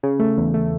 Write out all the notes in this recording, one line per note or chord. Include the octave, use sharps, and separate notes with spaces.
C#3
A3
E2
A3